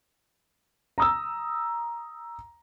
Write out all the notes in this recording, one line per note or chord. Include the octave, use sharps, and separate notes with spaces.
A#5 D#6 E6